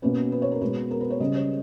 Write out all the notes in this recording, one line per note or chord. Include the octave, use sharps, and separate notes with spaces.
B2 A#3 C#4 B4
B4
C#5
A#4
B2 G#3 B3 B4
A#4
B4
C#5
C#3 G3 C#4 D#5
C#5